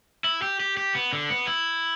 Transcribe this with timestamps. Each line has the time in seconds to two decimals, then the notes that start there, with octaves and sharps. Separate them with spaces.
0.24 E4
0.42 G4
0.60 G4
0.77 G4
0.95 B3
1.13 D3
1.30 B3
1.47 E4